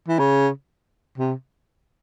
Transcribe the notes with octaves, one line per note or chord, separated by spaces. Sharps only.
E3
C#3
C3